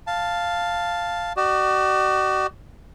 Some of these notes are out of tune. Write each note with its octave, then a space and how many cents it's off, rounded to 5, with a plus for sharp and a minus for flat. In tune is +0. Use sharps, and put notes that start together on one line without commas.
F5 +0 A5 +0
F#4 +40 D5 +45